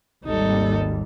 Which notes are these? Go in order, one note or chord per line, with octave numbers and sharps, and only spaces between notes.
G#1 D#2 G3 D#4 A4